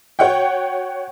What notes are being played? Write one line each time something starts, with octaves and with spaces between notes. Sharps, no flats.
F#4 C#5 F#5 G5